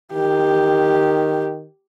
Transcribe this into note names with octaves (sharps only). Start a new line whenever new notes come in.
D#3 G4